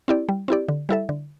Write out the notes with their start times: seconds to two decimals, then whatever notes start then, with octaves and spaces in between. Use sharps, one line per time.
0.08 C4 E4 G4 D5
0.29 G3
0.48 C4 E4 G4 D5
0.68 D3
0.89 G3 E4 A4 E5
1.09 D3